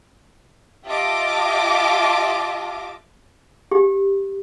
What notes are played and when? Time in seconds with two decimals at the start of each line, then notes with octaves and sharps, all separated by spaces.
0.86 F4 G4 D#5 E5 A5 D6
3.71 G4